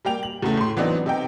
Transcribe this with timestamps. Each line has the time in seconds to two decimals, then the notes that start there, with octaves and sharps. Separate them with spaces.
0.05 G3 A#3 G5 F7
0.23 F#7
0.43 E2 C#3 A3
0.57 A2 C6
0.77 E3 F#3 B3 C4 D4 D#4
1.06 C3 D#4 G5